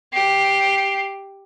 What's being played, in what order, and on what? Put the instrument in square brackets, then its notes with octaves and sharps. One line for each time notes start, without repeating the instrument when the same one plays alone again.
[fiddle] G4 [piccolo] C7